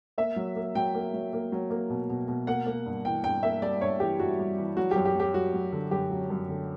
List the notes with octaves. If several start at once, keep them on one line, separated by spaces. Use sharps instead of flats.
A#3 E5
F#3
A#3
F#3 G5
A#3
F#3
A#3
F#3
A#3
B2
B2
B2
A#3 F#5
A#3
G2
E3 G5
G2 G5
A#3 E5
G3 D5
G2 C#5
E3 G4
G2 F#4
G3
E3
F#3 F#4
F#2 G4
G4
F#3 G4
F#2 F#4
F#3
D3
F#2 G4
F#3
F#2
D3